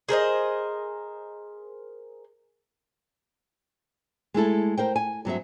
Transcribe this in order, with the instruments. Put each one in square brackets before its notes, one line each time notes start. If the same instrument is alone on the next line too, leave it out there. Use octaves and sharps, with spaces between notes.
[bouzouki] G#4 A#4 C5 D#5
[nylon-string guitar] G#3 A3 E4 A4
A#4 C5 G5
G#5
G2 F#3 C4 E5